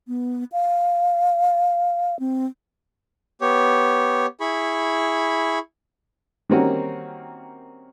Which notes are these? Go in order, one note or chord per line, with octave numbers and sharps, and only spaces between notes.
B3
F5
C4
B3 G4 C#5
E4 G#4 B5 C#6
D#3 G3 A#3 C4 C#4 F#4